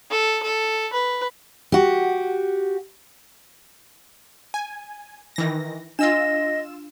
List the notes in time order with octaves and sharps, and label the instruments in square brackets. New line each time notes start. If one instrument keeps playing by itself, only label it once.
[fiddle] A4
A4
B4
[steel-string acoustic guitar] F#4 G4
[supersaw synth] G#5
D#3 E3 A#6
[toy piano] D4 [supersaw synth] F4 E6 E7 [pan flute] D#5